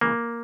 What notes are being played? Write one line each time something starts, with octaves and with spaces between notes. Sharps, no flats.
C#3 E3 G#3 A#3